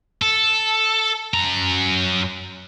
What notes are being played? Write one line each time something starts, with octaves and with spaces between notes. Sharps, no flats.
A4
F#2 A#5